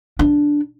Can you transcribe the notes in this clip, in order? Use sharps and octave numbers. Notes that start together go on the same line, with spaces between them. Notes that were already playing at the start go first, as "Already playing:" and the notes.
D4